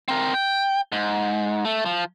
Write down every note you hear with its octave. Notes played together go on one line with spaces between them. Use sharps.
C4 A#4
G5
G#2
A3
F3